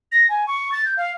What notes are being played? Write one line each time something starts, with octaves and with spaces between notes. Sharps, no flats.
A#6
G#5
C#6
A6
G6
F5